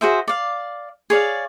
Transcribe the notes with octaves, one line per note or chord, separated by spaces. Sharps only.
F#4 G#4 C5 E5
D5 F5
G#4 C#5 D5 F5